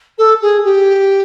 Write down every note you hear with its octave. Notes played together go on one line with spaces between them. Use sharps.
A4
G#4
G4